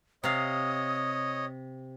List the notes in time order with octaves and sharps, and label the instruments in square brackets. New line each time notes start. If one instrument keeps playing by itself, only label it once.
[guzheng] C3 F5 [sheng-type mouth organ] C#5 D#5 [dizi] D#6